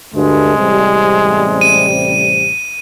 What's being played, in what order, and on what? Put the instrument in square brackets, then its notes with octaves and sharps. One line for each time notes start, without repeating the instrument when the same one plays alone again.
[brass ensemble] D2 G2 A3 [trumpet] G#3
[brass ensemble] A1 C3 G3
[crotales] D#7